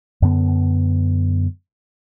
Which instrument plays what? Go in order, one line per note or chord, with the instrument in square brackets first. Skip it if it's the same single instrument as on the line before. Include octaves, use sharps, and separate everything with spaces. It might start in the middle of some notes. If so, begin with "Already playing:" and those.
[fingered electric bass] F#2 D3 B3